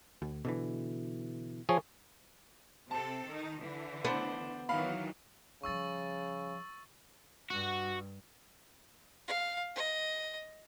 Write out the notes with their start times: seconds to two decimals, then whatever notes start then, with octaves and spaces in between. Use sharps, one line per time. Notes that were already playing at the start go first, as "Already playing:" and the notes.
0.22 D2
0.45 B2 D3 E3
1.69 F3 G#4 C#5
2.91 C3 C4 A4 A5
3.28 D#3 D#4
3.61 D3 E3
4.05 B3 D4 C5
4.69 D#3 E3 F#3 F5 B5
5.63 C#3 F3 G3 C#6 E6 A6
7.50 G2 F#4
9.28 F5
9.75 D#5